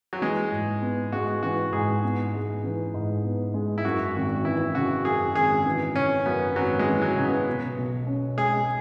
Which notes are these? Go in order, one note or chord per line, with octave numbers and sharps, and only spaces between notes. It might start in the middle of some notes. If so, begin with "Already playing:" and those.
F#3
E3 G#3
G#2
B3
G#3 F#4
E3 F#4
G#2 G#4
B3
G#3
E3
G#2
B3
G#3
E4
F#2 F#4
G#1 F#4
E3 E4
C#3 F#4
F#2 G#4
G#1 G#4
E3
C#3 C#4
F#2 B3
G#1 F#3
G#3
E3
F#3
C#3
B3
B2
B1
C#4
G#3 G#4